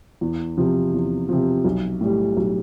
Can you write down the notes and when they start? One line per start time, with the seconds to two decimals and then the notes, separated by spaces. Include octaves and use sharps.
0.21 E2
0.57 C3 F3
0.93 E2
1.29 C3 F3
1.64 B1
2.01 A2 G3
2.37 B1